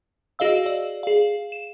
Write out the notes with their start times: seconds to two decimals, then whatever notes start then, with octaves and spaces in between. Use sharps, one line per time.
0.39 F#4 G#4 D#5 F5 E6
0.66 D5
1.03 G#4 F5
1.52 E7